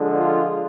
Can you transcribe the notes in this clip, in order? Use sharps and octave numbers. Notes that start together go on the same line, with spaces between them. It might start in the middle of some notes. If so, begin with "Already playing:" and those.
Already playing: D3 F3 G#3
F4